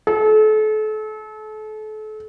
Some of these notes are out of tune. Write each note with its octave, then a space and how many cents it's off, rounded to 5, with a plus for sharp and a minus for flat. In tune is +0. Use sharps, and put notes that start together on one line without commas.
A4 -35